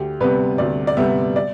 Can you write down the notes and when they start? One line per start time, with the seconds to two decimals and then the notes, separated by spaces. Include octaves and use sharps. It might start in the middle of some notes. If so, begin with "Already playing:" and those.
Already playing: D2 G4
0.20 C3 G3 B3 B4
0.58 D2 D5
0.87 D5
0.97 C3 G3 B3 E5
1.36 D5